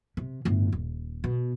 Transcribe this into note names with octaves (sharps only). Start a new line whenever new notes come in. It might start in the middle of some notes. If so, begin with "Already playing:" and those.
C3
G1 A2
D#1
B2